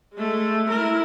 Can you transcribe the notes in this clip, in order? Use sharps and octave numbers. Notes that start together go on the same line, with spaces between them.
G#3 A3
E4 A#4